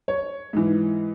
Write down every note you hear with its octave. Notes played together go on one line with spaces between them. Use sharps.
C#5
G#2 E3